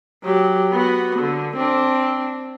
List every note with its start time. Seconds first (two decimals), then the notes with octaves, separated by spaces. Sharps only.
0.24 F#3 G4
0.73 B3 F#4
1.20 D3
1.56 C4 D4